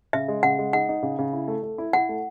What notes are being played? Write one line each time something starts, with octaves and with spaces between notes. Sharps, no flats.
C#3 E5
G#3
C#3 F#5
G#3
D#4 F#5
D#4
C#3
C#3
E4
A3
A3
E4
E4 F#5
A3